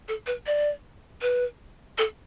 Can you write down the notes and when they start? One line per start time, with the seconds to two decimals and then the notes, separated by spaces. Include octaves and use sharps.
0.08 A4
0.27 B4
0.47 D5
1.22 B4
1.98 A4